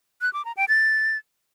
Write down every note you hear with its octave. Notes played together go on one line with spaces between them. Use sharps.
F#6
D6
A#5
G5
A6